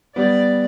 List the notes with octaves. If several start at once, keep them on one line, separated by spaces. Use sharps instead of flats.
G3 B3 D5